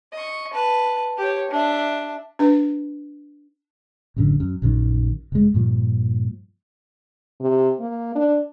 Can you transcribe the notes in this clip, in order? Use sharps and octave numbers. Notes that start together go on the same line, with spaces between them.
D#5 C#6
B4 A5
G4 C#5
D4 E5
D4 B4
A1 F#2 D3
F#2
A#1 F#2 D#3
F1 G#3
G2 A#2 F3
C3
A#3
D4